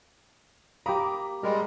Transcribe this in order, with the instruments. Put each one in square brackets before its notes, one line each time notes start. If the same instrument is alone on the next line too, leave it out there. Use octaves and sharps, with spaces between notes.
[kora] A#3 G4 [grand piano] A#5 B5 D#6
[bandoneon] G3 G#3 [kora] A#4